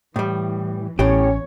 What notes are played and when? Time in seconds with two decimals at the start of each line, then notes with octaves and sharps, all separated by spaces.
0.16 A2 E3 G3
0.99 A1 E2 A2 C#4 G4 C#5